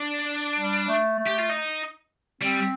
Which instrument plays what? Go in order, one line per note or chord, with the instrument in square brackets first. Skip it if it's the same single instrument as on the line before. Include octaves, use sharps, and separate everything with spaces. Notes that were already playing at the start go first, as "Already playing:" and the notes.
Already playing: [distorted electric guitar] D4
[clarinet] G3
A3
A3
[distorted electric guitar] G4
F4
D#4
[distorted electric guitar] G3 [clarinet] C4